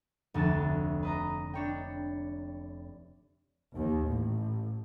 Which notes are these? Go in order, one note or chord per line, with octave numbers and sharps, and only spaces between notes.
F1 D2 B3 A5 A6
B4 D#5 A#5
D4 C#5 G5
D#2
A1